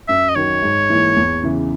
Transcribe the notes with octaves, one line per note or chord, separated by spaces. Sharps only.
F#2 E5
D#5
D#3 F#3 C#5
G#2
E3 A#3 E4
E2
C#3 E3